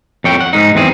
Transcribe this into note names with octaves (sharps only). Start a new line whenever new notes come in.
F2 C#5 G5
F#5
G#2 D#4
E2 C4 G#4